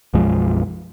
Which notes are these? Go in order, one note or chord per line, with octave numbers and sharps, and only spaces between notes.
B1 F#2 F3 G#3